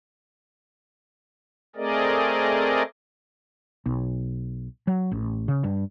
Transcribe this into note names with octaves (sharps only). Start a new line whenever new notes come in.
A3 C4 G#4 A#4 D5 D#5
B1
F#3
A1
C#3
G2